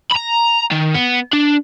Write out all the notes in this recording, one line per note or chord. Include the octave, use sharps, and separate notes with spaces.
A#5 B5
D#3
B3
D4